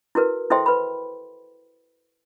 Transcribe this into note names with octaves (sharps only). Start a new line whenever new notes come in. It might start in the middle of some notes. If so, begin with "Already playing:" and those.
E4 F#4 A#4 B4
E4 A4 C5 E5 G5 C6
B4 B5